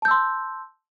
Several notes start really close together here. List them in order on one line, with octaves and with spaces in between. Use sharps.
A5 G6 E6 C6